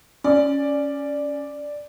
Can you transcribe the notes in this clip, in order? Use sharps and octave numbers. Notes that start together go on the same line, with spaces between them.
C#4 D5